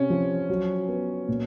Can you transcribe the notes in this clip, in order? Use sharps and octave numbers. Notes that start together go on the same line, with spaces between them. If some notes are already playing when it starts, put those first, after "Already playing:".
Already playing: C3 C#4
F3
F#3
B3
A#2